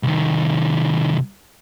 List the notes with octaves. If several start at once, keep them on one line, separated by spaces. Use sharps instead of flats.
C2 D#3